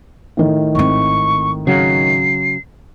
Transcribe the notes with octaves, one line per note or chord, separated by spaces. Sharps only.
A2 D#3
G#1 C4 C#6
C#3 F#3 C7